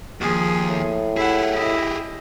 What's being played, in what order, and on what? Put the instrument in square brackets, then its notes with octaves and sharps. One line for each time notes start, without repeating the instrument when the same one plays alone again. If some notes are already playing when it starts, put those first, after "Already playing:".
[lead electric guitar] D#2 [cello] F3 G#4
[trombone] A2
[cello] E4 F#5 [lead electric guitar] G4 G#4
[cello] E4 D#5